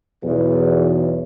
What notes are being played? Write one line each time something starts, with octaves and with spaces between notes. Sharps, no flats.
B1 E2